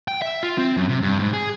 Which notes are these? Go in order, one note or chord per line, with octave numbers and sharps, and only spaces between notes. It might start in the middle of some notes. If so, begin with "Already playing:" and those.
G5
E5
F4
C4
F#2
C3
G2
G#2
G#4